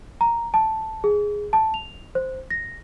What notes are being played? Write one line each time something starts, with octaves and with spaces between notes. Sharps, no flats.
A#5
A5
G#4
A5
F7
C5
A#6